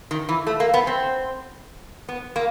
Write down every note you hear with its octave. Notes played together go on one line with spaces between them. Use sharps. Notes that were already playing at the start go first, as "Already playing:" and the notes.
D#3
E3
A3
A#3
B3
C4
B3
A#3